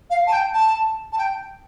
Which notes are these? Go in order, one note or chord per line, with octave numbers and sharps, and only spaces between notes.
F5
A5
G5
A5
A5
G5